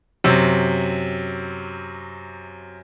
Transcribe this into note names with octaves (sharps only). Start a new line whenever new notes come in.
F#2 C3